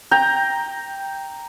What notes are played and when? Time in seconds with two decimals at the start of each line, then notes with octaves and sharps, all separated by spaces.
0.11 G5 A#5